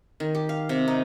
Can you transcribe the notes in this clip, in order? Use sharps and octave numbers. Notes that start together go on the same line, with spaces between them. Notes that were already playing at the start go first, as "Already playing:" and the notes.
D#3
G4
F5
C3
D#4